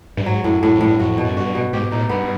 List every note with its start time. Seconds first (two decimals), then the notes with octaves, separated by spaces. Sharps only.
0.17 G2
0.26 G#2 F#3
0.44 F#2 A2
0.63 F#2 A2
0.75 F2
0.81 A2
0.87 G2
0.99 F2 F#4
1.12 F2
1.18 B2
1.24 F#2
1.36 G2 F#4
1.55 B2
1.73 G#2 G4
1.91 A2 D#4
2.09 G2 B3